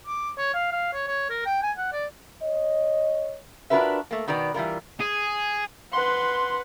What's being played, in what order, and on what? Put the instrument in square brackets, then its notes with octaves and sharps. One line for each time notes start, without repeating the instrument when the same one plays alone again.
[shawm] D6
C#5
F5
F5
C#5
C#5
A#4
G5
G#5
F#5
D5
[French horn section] C#5 D#5
[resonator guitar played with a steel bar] D4 F4 F#4 A#4 B4 E5
A3 A#3
B2 D#3 B3 D5
E3 G3 F4 A#4
[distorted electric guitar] G#4
[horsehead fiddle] B4 F#5 [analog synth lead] C6